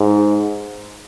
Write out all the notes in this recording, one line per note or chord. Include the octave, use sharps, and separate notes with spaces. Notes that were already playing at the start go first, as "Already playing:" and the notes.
Already playing: G#2